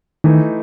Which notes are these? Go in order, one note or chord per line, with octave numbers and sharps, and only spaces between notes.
D#3 E3 A3 D#4